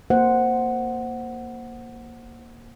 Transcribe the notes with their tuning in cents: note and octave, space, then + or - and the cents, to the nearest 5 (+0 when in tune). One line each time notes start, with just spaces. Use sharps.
A#3 +0 C5 +0 F#5 +0